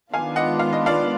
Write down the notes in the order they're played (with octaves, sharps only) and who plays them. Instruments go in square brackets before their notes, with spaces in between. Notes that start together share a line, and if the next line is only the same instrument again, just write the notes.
[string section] D#3 G#3 B3 D4 F4 [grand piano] F5 G#5
[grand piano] D#5 F#5
F5
D#5
D5 F5